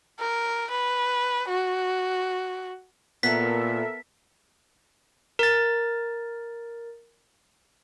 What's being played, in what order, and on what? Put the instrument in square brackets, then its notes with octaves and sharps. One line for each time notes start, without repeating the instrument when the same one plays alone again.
[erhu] A#4
B4
F#4
[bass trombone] A#2 [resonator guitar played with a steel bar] B3 [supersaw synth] A4 A#4 E5 [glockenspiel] B6
[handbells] A#4 A6